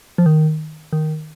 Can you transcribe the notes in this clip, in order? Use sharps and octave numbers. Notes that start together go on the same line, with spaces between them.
F3
D#3
D#3